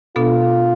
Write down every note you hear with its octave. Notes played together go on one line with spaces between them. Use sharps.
B2 B3 D4 F4 A4